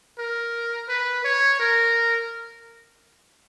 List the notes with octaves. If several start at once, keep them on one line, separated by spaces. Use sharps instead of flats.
A#4
B4
C#5
A#4